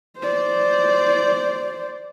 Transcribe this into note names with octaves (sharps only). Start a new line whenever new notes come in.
C5 D5